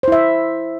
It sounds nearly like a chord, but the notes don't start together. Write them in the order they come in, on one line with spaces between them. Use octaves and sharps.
C5 E4 E5